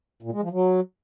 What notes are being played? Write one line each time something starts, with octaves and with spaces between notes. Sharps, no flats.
A#2
G#3
F3
F#3